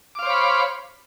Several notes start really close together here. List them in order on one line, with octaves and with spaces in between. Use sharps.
D6 F5 C5 C#5 B5